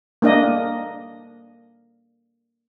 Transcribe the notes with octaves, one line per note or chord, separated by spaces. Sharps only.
A#3 D4 D#5